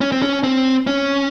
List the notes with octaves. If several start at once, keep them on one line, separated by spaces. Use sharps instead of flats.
C#4
C4
C#4
C4
C#4